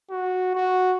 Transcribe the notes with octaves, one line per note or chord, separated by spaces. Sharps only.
F#4
F#4